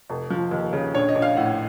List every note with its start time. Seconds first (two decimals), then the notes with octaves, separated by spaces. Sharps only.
0.10 F1
0.30 F3
0.51 D#2
0.73 C#3
0.94 A#1 C#5
1.09 D#5
1.15 A#1
1.22 F5
1.37 A2 F#5